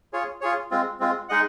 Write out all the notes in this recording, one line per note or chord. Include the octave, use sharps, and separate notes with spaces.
F4 G#4 C#5
F4 G#4 C#5
G#3 C4 F4
G#3 C4 F4
G#3 D#4 G#4 D#5 F#5